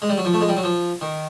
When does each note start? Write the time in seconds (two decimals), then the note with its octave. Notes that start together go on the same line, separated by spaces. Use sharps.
0.02 G#3
0.09 G3
0.18 F#3
0.25 F3
0.33 A3
0.41 G#3
0.49 G3
0.57 F#3
0.64 F3
1.01 D#3